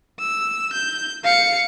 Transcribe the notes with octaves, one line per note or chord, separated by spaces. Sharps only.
E6
G6
F5 C#7